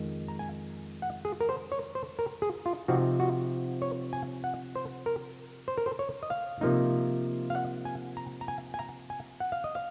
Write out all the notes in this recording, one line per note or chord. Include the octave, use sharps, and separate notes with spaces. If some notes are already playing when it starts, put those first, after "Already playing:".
Already playing: F2 D#3 G#3
A#5
G#5
F#5
G#4
A#4
C5
C#5
C5
A#4
G#4
F4
C3 F3 C4 D#4 F#4
F#4
C#5
G#5
F#5
C5
A#4
C5
A#4
C5
C#5
D#5
F5
C3 F3 A#3 D#4
F5
F#5
G#5
A#5
A#5
G#5
G#5
A#5
G#5
F#5
F5
D#5
F5